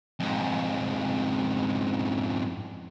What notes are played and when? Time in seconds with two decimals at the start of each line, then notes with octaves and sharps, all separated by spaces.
0.20 F2 G#2